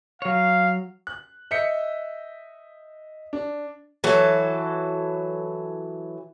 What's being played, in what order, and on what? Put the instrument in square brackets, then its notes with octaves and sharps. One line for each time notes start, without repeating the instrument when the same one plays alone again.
[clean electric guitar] F#3 C#5 [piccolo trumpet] F5
[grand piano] F#6
D#5 E5 G6 B6 C#7
D4
[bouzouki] E3 F#3 A4